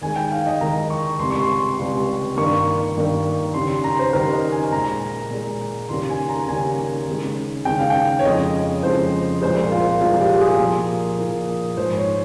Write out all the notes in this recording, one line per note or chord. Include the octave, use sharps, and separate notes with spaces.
D#2 D#3 G#3 G#5
G5
F5
D#5
D#2 D#3 G#3 A#5
C#6
C#2 C3 G3 C6
C#6
C6
C#2 C3 G3
G2 D#3 A#3 C#6
G2 D#3 A#3
D#2 C#3 G3 C6
C6
A#5
C5
D#2 C#3 G3 A#4
D#5
G#5
A#2 G#3 A#5
A#2 G#3
D#2 C#3 G3 A#3 C6
G#5
A#5
D#2 C#3 G3 A#3 G#5
D#2 C#3 G#3
D#2 C#3 G#3 G5
F5
G5
C#5
F2 C#3 F3 G#3 D#5
F2 C#3 F3 G#3 C5
C2 A#2 F3 G#3 C5
F4
C2 A#2 F3 G#3 F4
G4
G#4
A#2 F3 A#3
A#2 F3 A#3
G#2 F3 G#3 C5
C#5